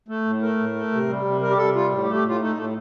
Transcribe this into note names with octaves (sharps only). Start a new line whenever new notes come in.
A3
A2
A3 A#4
A2
A3
C3
G3
C3
G3 A#4
G4
C3 A4
G3 F4
A2
G4
A3
G4
A2 F4
A3 D#4
A2 A3